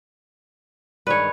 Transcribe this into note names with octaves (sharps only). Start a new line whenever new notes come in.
G2 D#3 G#3 B4 C#5